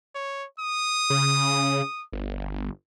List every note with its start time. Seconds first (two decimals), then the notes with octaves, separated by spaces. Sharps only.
0.15 C#5
0.60 D#6
1.10 C#3
2.12 G1